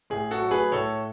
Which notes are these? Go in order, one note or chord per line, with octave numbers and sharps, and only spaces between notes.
A2 G#4
F#4 A4
F#3 A3
G#4 B4
A2 A4 C#5